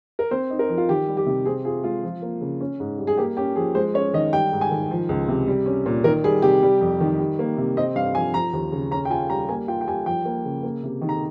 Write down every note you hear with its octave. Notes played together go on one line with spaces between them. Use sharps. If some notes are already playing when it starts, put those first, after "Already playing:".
A#4
C4 C5
D#4
A#4
F3
F4
D#3 G4
G3
G4
C3
C4 G#4
F4 G#4
G#3 F4
F3
A#3
C#3
C#4
G#2
G3
G#4
A#3 G4
C#4 G4
F3 G#4
G#3 C5
C#4 C#5
D#3 D#5
G3 G5
G#2
G#5
D#3
F3
C#2
C3
G3
C#4
A#2
D#3 A#4
G3 G#4
C3 G4
G3
F2
D#3
G3
A#3
C3
C4 D#5
G2 F5
F3 G#5
F3 A#5
D#2
C#3
C#4 A#5
G5
F4 G#5
G3 A#5
A#3 G#5
F4 G5
G5
G3 G#5
F3 G5
A#3
C#3
A#3
C3
D#3
A#5